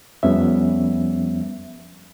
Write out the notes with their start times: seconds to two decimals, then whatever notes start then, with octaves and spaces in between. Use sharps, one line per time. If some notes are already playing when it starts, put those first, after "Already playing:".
0.23 F2 F3 G3 B3 C#4 E5